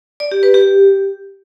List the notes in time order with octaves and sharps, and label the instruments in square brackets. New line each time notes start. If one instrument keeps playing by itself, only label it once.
[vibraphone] D5
G4
B4
G4